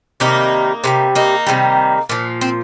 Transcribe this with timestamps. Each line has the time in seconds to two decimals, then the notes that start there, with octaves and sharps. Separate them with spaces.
0.20 C3 D#3 G3 A#3 D#4
0.84 C3 D#3 G3
1.15 A#3 D#4
1.47 C3 D#3 G3
2.09 A#2 F3
2.41 C4